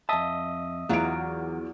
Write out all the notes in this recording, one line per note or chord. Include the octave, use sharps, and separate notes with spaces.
F2 D#5 E5 A5 D#6
E2 E3 F#3 F4 F#4 A#5 D7